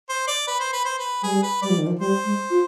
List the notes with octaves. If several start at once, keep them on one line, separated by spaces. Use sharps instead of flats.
C5
D5
B4
C5
B4
C5
B4
G3 G#4
B4
G3 D5
F3
D#3
F3
G3 C5
G#3
F4